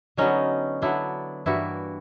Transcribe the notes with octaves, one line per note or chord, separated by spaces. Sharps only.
D3 F#3 B3 C#4 D#4
D3 F#3 B3 D4 E4
G2 E3 G3 A#3 E4 F#4